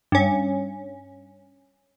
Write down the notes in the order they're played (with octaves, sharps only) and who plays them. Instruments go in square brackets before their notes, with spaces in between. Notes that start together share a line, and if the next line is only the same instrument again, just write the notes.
[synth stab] G2 C#4